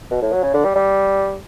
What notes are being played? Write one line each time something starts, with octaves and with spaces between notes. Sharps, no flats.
B2
A2
F#3
C#3
D3
G3
G3